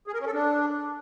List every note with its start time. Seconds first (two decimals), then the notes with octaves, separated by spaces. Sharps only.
0.07 G#4
0.14 A#4
0.20 C#4
0.27 A4
0.34 D4